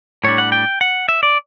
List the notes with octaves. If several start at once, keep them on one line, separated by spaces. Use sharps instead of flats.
A2 G3 D4 C#5
F#5
G5
F#5
E5
D5